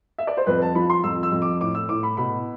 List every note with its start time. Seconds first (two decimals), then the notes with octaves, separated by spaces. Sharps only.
0.18 E5
0.27 D5
0.37 C5
0.46 F2 B4
0.62 A5
0.75 F3 B5
0.90 C6
1.04 F2 E6
1.23 E6
1.32 F2
1.42 D6
1.61 A2 D6
1.75 E6
1.89 A2 D6
2.03 B5
2.17 B2 B5